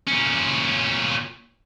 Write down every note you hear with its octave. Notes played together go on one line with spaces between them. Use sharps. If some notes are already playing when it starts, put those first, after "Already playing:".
A#2 C#4